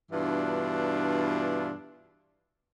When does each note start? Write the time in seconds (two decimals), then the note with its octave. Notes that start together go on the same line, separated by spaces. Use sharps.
0.12 G2 B2 E3 D4 F4